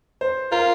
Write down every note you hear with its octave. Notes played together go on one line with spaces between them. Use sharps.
C5
F4 A#4